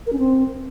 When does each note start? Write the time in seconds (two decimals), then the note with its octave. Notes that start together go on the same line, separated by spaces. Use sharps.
0.07 A#4
0.13 C#4
0.19 C4